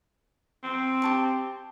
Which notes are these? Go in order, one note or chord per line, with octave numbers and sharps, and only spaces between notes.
C4
G4 A5 C#6